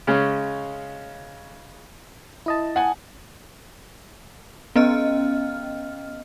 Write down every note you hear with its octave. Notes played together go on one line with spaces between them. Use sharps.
C#3 G#3 C#4
E4 D#5 A5
F#5 G#5
B3 C#4 D#5 F6